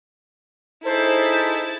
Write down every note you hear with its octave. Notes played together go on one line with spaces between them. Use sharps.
D#4 E4 G#4 A4 C5 A5